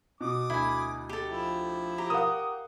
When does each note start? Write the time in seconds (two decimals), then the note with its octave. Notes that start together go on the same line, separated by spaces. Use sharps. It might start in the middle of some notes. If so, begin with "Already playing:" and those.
0.21 B2 D6 D#6
0.50 D2 E4 G#5
1.09 G4 A4
1.29 F3 E4
1.98 G4 A#5
2.10 A#4 F5 F#5 D#6